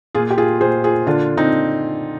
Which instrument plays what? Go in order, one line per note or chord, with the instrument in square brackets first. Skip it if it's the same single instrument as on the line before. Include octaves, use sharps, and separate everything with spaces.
[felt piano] A#2 F4 G#4
G4
F4 G#4
A#2 G#4 C5
F4 G#4
D3 D4 F4
C4 D#4